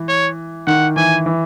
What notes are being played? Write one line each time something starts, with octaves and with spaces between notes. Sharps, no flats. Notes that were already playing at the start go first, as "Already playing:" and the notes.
Already playing: E3
C#5
D#3 F#5
E3 G#5
E3